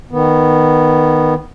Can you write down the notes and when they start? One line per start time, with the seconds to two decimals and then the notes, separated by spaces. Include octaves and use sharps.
0.11 D#3 B3